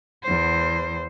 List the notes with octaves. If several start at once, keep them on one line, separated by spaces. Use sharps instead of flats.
E2 C5